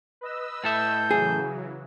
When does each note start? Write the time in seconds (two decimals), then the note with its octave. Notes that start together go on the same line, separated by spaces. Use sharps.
0.21 B4 D#5 E6
0.64 A2 A4 E5 G6
1.11 C#3 E3 F#3 G#4